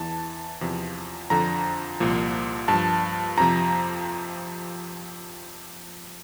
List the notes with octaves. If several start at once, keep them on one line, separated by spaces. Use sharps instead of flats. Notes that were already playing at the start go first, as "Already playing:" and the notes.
Already playing: E2 E3 A5
E2 C3 F3
F2 D3 F3 A#5
C2 A#2 F3
G2 A5
F3
F2 C3 F3 A#5